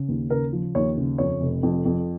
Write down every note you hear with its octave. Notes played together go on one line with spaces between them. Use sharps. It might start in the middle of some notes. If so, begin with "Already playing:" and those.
Already playing: C#3
D#2
C#3 A#4
F3
D#2 C#5
C#3
F2 C#5
F1
F2
F2